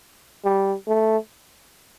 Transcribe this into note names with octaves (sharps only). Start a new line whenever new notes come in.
G3
A3